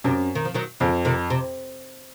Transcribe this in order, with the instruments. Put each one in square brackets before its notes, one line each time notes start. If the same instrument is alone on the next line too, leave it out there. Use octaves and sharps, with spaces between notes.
[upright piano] F#2 [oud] C3
[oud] D#3
F3
D#3 F#3
[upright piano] F2 [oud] C#3 F3
[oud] C3 D#3
C3